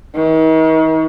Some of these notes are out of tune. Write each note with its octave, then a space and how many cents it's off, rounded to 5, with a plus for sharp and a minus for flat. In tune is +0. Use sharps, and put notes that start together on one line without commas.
D#3 +40